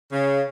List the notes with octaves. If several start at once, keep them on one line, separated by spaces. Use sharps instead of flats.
C#3